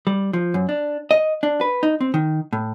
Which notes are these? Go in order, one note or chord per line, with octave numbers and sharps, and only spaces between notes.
G3
F3
F#2
D4
D#5
D4
B4
D#4
C4
D#3
A2